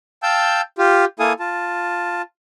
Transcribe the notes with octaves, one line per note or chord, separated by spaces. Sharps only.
F5 G5 A5 E6 G6
F4 G4
A#3 E4 A4 F5 G#5 D#6
F4 A5